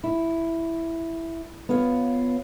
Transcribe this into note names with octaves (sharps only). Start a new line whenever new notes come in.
E4
B3 F4 C#5 F5